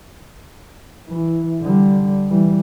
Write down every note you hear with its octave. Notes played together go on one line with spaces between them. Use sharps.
E3 E4
D3 G3
E3 G3